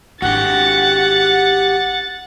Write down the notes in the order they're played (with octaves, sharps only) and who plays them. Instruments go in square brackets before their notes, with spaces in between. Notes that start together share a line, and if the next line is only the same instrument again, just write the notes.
[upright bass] G#1 D4 [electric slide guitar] F#4 G4 [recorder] F#5 [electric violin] A6